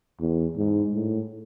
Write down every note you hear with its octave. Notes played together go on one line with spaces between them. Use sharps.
E2
G#2
A2